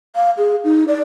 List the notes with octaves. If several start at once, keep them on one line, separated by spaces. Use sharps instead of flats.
F5
G#4
D#4
D5